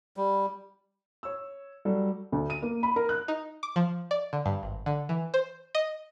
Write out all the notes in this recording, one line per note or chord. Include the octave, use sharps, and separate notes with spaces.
G3
C#5 E6
F#3 G3 A4
D2
D#7
A#3
B5
A#4
F#6
D#4
D6
F3
D5
D3
G2
G#1
D3
E3
C5
D#5